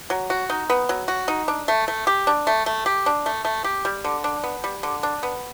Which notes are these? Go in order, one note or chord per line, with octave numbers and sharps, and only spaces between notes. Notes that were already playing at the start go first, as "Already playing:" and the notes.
F#3
F#4
D#4
B3
F#3
F#4
D#4
D4
A3
A3
G4
D4
A3
A3
G4
D4
A3
A3
G4
G3
D3
D4
B3
G3
D3
D4
B3